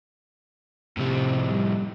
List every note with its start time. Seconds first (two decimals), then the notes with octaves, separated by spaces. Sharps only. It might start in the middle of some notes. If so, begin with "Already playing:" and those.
0.97 A2 C3 F3
1.49 G3